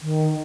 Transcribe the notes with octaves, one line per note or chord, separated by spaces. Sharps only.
D#3